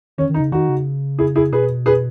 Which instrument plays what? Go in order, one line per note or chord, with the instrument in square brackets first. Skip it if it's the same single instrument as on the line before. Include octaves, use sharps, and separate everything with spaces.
[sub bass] D#3 [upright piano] C#4
[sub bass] D#3
[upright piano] D#4
[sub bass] C#3
[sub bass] D#3 [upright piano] D#4 F#4
[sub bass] C#3
[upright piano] E4 G#4
E4 G#4
[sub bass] B2 [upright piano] G#4 B4
[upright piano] G#4 B4